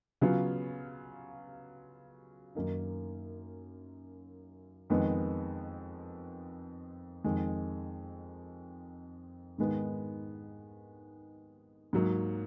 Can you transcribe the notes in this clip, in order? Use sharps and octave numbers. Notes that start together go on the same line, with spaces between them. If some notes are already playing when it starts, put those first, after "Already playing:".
C#3 F#3 B3 F4
F#2 D#3 A#3 D#4
F2 D#3 G#3 B3
F2 D#3 G#3
G#2 D#3 G#3 B3
G#2 F#3 A#3